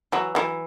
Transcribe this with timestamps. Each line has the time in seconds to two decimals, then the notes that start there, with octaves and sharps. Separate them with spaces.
0.12 E3 F#3
0.35 E3 F#3